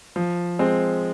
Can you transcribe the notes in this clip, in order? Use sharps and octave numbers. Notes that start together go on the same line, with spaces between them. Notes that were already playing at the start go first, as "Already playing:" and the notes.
F3
G#3 C4